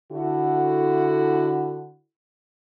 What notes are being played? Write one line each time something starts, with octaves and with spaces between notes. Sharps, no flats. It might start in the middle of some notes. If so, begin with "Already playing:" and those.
D3 E4 F#4